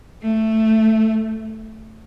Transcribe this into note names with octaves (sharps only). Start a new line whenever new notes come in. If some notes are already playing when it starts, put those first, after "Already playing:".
A3